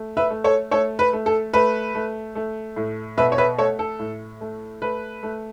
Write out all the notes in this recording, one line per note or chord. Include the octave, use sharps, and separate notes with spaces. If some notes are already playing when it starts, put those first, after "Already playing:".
Already playing: A3
B4 E5
A3
A4 C#5
A3 A4 C#5
B4
A3
A4
A3 B4
A3
A3
A2
B2 B4 E5
C#5
B4 E5
A3 A4 C#5
A4
A2
A3
A3 B4
A3